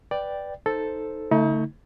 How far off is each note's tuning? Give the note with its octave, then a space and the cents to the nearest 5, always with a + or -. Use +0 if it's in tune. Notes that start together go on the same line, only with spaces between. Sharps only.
B4 +0 D5 +0 G5 +0
D#4 +0 A4 +0 C5 +0
D3 -45 A3 +15 D#4 +40